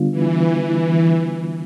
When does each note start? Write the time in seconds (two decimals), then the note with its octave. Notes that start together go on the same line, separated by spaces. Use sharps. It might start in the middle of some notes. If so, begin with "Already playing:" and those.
Already playing: D3 G3 B3 D4 F4
0.11 E3
0.58 E3